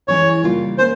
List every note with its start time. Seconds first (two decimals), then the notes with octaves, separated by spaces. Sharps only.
0.08 E3 G#3 C#4 E4 C#5
0.43 C#3 G3 A#3 F4
0.78 A#3 C#4 C5